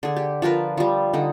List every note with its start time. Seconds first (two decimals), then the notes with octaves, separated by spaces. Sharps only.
0.03 D3 G#4
0.16 G4
0.42 F3 D4 A#4 B4
0.77 F3 G3
1.13 D3 D#4